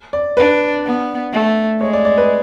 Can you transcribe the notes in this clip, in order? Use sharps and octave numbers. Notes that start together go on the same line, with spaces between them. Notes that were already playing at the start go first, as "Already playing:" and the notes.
D5
D4 B4
B3
A3
G#3 C#5
D5
D5
B4